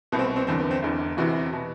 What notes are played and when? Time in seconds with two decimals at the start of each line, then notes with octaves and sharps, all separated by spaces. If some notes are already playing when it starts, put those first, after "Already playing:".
0.12 C2 B2 B3
0.19 C4
0.24 B3
0.36 C4
0.47 F#1 E2 D3 C4
0.60 B3
0.71 C4
0.83 E1 E2 D3
1.17 E1 E2 C3 E3 F#4
1.53 B2